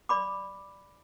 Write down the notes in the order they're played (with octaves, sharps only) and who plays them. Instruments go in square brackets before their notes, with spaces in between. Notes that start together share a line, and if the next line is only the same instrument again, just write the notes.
[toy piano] D5 B5 D6